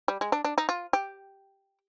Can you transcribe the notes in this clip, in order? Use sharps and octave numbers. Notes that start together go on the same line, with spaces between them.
G3
G#3
D4
D4
D#4
F4
G4